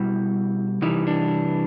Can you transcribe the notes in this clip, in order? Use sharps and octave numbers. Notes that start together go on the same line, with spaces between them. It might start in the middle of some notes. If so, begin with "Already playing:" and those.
Already playing: B2 G3 E4
C3 E3 G3 D#4
D4